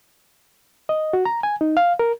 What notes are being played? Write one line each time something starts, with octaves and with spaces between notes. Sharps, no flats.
D#5
F#4
A#5
G#5
D#4
F5
A#4